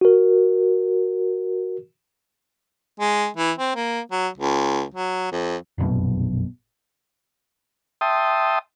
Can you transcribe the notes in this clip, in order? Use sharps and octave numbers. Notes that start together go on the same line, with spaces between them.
F#4 A#4
G#3
E3
C4
A#3
F#3
C#2
F#3
F2
F1 A#1 F#2 B2
E5 G5 A5 C6 D#6